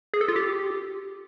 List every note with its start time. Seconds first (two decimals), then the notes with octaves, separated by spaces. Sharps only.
0.14 G#4
0.21 A4
0.28 F4
0.36 G4